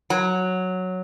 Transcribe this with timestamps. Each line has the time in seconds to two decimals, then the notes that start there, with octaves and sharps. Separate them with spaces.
0.10 F#3